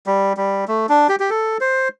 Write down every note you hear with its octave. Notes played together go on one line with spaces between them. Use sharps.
G3
G3
A3
D4
G4
G4
A4
C5